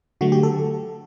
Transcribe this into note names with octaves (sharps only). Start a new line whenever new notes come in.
D3 F#3 A3 F#4
G4
A4